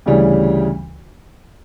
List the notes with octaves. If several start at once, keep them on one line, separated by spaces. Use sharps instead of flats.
D2 C#3 E3 G3 C#4